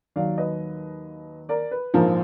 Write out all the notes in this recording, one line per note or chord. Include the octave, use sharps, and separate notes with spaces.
D#2 D#3 F#3 D5 F5
B4 D#5
A#4 D5
B4
A#1 G#2 F3 A#4